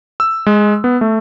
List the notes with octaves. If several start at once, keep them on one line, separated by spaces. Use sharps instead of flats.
E6
G#3
B3
A3